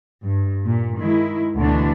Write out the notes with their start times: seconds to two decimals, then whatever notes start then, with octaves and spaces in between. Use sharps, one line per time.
0.23 G2
0.66 A#2
0.98 D#3 G#3 E4
1.57 D2 B2 D3 E3 D4